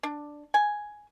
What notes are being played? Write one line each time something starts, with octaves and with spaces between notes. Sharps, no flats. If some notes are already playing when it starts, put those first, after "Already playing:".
D4
G#5